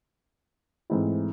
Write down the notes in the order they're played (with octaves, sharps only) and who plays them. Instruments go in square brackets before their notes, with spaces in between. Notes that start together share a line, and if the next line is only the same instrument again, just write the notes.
[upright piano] G#2 E3 A3 C4 E4